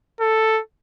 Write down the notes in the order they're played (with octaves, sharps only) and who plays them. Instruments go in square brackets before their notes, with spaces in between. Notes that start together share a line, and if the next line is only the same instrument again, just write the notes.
[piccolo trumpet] A4